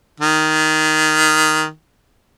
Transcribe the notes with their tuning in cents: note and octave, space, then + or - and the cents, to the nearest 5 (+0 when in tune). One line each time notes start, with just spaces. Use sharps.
D#3 +0